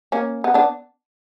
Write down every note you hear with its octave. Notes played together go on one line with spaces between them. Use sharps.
A#3 C#4
B3
B3 D4